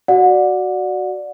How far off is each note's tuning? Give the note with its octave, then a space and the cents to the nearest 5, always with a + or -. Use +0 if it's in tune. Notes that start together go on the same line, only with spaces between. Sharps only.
F#4 +5 D5 +0 F#5 -30